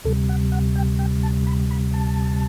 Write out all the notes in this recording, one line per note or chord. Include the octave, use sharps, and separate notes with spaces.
D2 C3 G3 A4
F#5
F#5
G5
G5
A5
B5
B5
A5